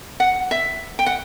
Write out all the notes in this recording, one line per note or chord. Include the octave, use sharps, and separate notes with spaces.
F#5
E5
G5
F#5